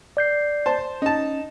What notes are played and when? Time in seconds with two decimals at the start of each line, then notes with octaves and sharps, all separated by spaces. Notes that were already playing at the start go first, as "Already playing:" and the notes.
0.17 D5 G6 C7
0.66 C5 A5
1.02 C#4 D#4 A5